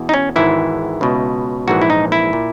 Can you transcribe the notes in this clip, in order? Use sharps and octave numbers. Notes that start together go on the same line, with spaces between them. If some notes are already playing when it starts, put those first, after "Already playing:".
Already playing: E2 B2
D#4
C#4
G#1 G#2 E3 E4
C#2 B2
A#1 G#2 E3 F#4
E4
D#4
E4
A#2